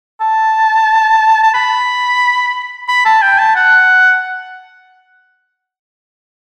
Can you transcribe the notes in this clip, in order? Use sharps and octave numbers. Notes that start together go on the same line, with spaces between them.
A5
A5
B5
B5
A5
G5
A5
F#5